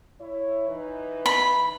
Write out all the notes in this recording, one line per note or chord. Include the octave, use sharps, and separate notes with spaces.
E4 C#5
E3 D#4 B4
B5